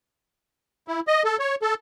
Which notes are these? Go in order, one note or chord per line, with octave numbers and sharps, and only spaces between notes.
E4
D#5
A4
C#5
A4